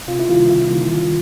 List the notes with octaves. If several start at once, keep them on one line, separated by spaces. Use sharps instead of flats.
C3 F4
E4
D#3 G3 A#3 F4
C3 F4
D#3 G3 A#3
C3